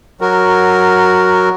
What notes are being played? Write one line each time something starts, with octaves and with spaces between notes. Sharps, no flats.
F#3 F#4 A#4